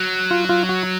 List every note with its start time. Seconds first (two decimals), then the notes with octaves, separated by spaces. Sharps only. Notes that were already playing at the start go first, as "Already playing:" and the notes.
Already playing: F#3
0.31 F4
0.49 F4
0.69 F#4